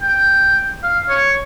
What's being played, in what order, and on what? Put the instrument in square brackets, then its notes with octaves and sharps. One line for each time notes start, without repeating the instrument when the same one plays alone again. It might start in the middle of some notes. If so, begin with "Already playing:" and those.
[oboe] G5
F5
C#5